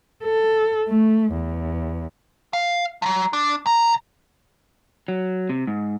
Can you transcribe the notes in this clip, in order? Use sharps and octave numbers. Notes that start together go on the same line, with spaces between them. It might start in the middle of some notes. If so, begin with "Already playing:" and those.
A4
A3
E2
F5
F3 F#3
D4
B1 A#5
F#3
C3
G#2